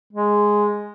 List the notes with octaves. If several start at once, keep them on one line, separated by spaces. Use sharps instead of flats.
G#3